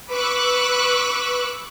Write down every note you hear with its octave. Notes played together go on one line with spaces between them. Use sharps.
B4 C#6 D6 E6 F#6